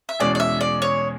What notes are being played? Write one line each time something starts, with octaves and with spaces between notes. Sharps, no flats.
E5
E2 B2 G#3 C#4 G#4 D5
D5
E5
D5
C#5